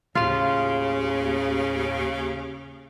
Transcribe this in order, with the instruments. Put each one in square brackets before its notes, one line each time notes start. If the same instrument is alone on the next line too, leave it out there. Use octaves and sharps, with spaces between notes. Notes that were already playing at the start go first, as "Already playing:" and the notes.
[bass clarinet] D#2 [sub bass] A2 [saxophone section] C#3 [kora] F4 F5